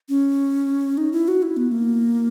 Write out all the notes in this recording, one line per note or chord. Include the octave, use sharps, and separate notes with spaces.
C#4
D#4
E4
F#4
E4
B3
A#3